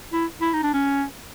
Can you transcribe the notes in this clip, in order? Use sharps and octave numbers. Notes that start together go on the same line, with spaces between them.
E4
E4
D#4
D4
C#4